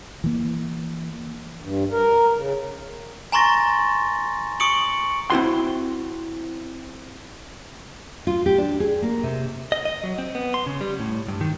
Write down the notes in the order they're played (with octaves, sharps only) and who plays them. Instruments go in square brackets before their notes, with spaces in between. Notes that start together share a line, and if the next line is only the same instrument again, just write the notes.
[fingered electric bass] E3 A#3
[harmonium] G2
A#4
C#3
[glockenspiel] G#5 A#5 C6 C#6 A6 A#6
C#6 D#6 C#7 D7 F#7
[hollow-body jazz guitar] C4 E4 F#4 C6
[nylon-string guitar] F4
G4
D4
G#4
A#3
C3
[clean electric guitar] D#5
D#5
F#3
C4
B3
C6
C#3
G3
A2
G2
D#3